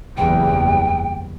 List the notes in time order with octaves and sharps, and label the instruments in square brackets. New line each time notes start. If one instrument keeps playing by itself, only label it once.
[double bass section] F#1 E2 G3 [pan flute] G5